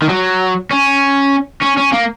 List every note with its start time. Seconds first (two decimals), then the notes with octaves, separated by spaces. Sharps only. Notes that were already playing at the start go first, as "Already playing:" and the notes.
0.02 D#3
0.09 F#3
0.71 C#4
1.62 C#4
1.77 C#4
1.92 A#3